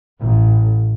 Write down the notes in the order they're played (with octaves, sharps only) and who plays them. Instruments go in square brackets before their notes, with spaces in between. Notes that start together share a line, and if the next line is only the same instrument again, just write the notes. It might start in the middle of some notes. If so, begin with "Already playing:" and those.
[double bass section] A1